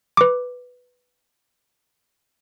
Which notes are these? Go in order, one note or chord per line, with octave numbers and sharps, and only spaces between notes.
B4 D6